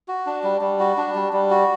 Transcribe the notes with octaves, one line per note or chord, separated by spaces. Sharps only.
F#4
D4
G3
G3
F#4
D4
G3
G3
F#4